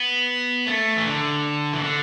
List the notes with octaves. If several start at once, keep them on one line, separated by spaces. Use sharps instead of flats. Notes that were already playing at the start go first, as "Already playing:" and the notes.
Already playing: B3
A3
E3
D3
E3
D3